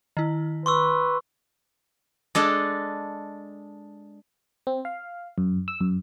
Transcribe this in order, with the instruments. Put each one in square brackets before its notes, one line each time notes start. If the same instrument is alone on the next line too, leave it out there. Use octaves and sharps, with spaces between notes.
[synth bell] D#3 E4
[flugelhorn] B4 [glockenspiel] C6 C#6 E6
[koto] G#3 D4 A4
[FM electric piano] C4
F5
F#2
E6
F#2